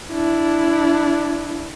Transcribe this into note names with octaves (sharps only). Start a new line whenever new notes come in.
D4 E4